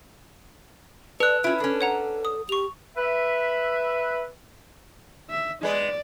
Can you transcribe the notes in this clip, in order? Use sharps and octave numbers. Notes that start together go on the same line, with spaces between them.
A4 B4 D5 F#6
C#4 E4 F4 D7
C#4 D4 A4
C#5 F#5 A#5
D#6
G4 C#6 F7
B4 E5
E5
G#3 B3 B4 D5